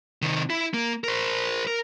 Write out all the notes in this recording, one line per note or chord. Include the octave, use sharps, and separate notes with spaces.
C3 D#3
E4
A#3
A#4 C5
A#4